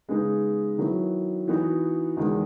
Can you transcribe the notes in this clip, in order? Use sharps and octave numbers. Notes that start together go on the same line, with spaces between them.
C#3 G#3 B3 D#4 G#4
D#3 F#3 B3 E4
E3 B3 D#4 F#4
E2 D#3 G#3